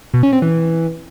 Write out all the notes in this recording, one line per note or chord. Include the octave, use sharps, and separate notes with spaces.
B2
C#4
C4
E3